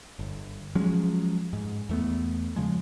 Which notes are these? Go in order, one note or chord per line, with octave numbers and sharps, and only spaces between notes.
G1
F3 F#3 G#3 C#4
G#2
E2 A3 B3
C#3 F3 G#3